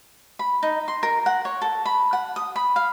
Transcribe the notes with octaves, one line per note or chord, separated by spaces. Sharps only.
B5
D#4
C6
A#4
F#5
C#5
A4
B5
F#5
D#6
B5
F5